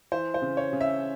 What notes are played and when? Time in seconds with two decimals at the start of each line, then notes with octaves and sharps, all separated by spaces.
0.12 E3 C5
0.34 C5
0.42 C#3
0.57 C#5
0.73 C#3
0.81 E5